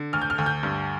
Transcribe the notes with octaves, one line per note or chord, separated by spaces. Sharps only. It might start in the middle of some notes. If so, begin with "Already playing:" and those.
Already playing: D3
D2 F6
G6
F6
D2
G6
G2